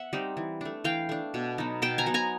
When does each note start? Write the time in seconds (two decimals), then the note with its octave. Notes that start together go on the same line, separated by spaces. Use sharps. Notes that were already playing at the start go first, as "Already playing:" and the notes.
Already playing: E5 F#5
0.13 G3 C4 D#4
0.37 E3
0.61 A3 D4
0.84 E3 F5 G5
1.09 A3 D4
1.34 B2
1.58 F#3 B3 D#4
1.82 B2 G5 A5
1.98 G#5 A#5
2.06 F#3 B3 D#4
2.14 G#5 A#5